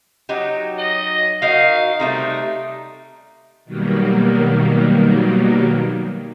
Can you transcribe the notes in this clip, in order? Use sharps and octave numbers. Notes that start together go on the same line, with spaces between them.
F#3 D#4 G4
D#5
D#4 F#4 A#4 F5
C3 G3 A3 D#4
B2 D#3 F#3 G3 A#3